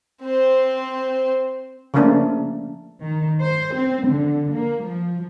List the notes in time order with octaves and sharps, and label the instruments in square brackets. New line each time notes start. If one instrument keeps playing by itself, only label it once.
[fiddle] C4 C5
[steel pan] C#3 F3 A3 A#3 D4
[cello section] D#3
C5
C4
D3
A#3
F3